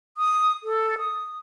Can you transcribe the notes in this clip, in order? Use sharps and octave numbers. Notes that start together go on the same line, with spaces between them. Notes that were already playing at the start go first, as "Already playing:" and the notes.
D#6
A4
D#6